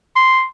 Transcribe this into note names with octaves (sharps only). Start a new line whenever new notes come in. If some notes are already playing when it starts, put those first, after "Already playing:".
C6